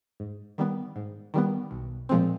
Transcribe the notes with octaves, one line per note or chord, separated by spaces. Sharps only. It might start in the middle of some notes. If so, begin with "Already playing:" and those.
G#2
D#3 G3 B3
G#2
D#3 G3 B3
B1
A#2 F3 G#3 C4